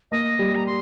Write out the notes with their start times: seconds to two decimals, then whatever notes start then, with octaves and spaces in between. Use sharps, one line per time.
0.11 A#3 D#5
0.39 G3
0.55 A#5
0.66 C6